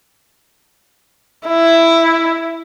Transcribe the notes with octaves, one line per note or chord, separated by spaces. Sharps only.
E4